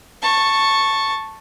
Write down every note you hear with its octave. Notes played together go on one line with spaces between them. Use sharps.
A5 C#6